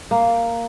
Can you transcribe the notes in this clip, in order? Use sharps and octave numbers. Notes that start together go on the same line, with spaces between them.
A#3